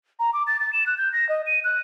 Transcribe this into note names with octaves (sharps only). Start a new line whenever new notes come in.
A#5
D6
A6
A6
E7
F#6
G6
A#6
D#5
D#7
F#6